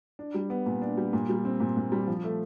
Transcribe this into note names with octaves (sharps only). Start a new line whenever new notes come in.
D4
G3
B3
A#2
D4
G3
A#2
G3
C4
A#2
A#2
G3
F3
A3